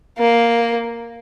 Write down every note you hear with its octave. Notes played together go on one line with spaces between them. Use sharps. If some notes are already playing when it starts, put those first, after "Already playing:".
A#3